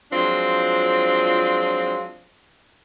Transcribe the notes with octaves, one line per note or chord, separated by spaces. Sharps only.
F3 F#3 G#3 C4 D4 F4